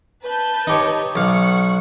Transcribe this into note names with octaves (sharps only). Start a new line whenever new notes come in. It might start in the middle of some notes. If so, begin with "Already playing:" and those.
B4 A5 G6
D#4 G4 C#5
B1 F5 F#5 C#6 C#7